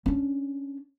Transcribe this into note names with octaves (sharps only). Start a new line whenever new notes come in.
C#4 D4